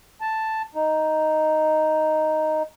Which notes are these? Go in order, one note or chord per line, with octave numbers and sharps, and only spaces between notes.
A5
D#4